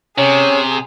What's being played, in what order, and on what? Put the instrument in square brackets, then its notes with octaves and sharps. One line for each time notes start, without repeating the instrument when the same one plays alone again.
[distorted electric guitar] C3 [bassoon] C#4 [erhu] G#4